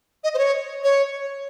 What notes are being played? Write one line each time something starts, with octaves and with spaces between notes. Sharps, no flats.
D#5
C5
C#5
C#5